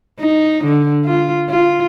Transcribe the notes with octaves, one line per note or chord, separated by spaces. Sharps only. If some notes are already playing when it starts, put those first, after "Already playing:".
D#4
D3
F4
F4